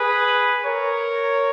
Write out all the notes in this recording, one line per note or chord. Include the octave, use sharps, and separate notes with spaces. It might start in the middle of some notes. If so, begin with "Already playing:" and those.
Already playing: G#4 B4
A#4 C#5